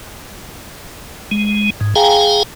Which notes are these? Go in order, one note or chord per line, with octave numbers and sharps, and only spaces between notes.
G#3
G#2
G#4 F5 G5 G#5 A#5